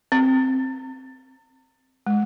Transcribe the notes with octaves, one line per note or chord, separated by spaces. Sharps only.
C4
G#3